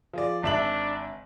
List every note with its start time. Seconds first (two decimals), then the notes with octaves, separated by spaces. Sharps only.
0.14 F3 G#4 D5
0.43 G#1 D4 E5 F#7